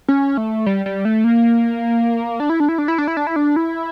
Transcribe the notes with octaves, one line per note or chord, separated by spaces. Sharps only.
C#4
A3
G3
G3
A3
A#3
D4
E4
D4
E4
D4
E4
D4
E4
D4
E4
D4
E4